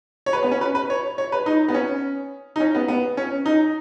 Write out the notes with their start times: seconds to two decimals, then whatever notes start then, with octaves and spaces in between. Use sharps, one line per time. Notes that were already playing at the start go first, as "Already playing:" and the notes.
0.26 C#5
0.33 B4
0.43 B3
0.51 C#4
0.61 B4
0.75 B4
0.90 C#5
1.18 C#5
1.32 B4
1.46 D#4
1.68 B3
1.74 C#4
2.56 D#4
2.60 C#4
2.75 B3
2.88 B3
3.17 C#4
3.46 D#4